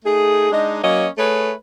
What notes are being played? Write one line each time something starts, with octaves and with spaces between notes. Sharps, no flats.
A3 D#4 G#4
G#3 D4 D#4
F#3 A#3 C#4 C#5 D#5
A3 G#4 B4 C#5